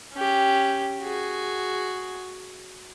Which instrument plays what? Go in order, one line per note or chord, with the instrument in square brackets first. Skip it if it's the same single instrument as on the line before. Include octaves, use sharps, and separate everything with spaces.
[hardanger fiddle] C#4 G4
F#4 G#4